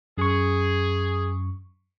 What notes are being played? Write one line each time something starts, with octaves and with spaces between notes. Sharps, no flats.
F#2 G#4 C#6